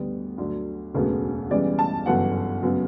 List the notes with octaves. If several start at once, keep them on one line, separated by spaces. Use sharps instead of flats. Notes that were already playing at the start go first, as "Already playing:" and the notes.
Already playing: D2 D3 G3 B3
D2 D3 F#3
E1 D2 C#3 F#3 B3
C#2 C#3 E3 G3 B3 D5
A5
G1 F#2 C#3 E3 B3 F#5
F#1 F#2 C#3 F#3 B3